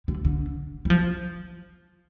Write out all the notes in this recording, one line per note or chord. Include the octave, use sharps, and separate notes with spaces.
D3
D3
G3
F3